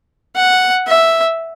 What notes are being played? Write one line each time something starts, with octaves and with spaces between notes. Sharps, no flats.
F#5
E5